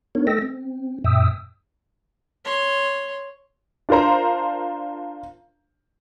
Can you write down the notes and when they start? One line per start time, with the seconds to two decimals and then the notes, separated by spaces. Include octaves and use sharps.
0.15 B3 D4 D#4 A#4 C#5
0.27 A3 A4 D#5 G5 E6 A#6
0.42 C4
1.04 F#2 A#2 E5 G5 D#6 E6
2.45 C#5 C6
3.89 D4 F4 A#4 C5 A#5